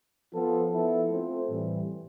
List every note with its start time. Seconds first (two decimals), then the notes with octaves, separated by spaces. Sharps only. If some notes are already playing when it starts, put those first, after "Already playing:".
0.33 F3 B3 F4 A4
0.71 F3 B3 E4 A4
1.09 A3 C4 F4 C5
1.48 A2 E3 G3 C4